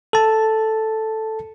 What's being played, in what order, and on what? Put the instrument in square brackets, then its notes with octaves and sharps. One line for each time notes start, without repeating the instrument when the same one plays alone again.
[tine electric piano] A4 A5